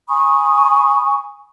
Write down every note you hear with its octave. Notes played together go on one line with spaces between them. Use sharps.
G#5 B5 C#6 D#6